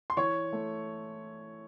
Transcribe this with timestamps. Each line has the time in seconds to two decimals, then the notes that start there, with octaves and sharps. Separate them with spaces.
0.10 C6
0.17 E3 C#5 C#6
0.53 A3